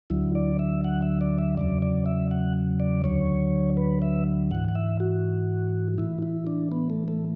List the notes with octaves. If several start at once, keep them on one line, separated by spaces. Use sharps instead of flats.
D2 D3 F#3 E4
D5
E5
F#5
E5
D5
E5
E2 C#3 F#3 D5
D5
E5
F#5
D5
D2 D3 F#3 C#5
B4
E5
G#2 E3 F#5
F#5
E5
F#4
A2 E3 E4
E4
D4
B3
A3
A3